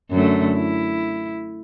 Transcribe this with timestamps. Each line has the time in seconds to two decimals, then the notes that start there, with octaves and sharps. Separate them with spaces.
0.11 F#2 D3 A3
0.56 E4